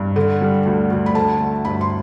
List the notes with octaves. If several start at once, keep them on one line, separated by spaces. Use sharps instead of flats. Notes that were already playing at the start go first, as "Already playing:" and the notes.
Already playing: G2
D3
G3
D2
D2
B5
D3 A5
A3
G2 B5
C6